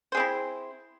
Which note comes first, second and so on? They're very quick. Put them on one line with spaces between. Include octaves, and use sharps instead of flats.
C5 G#4 C4 E4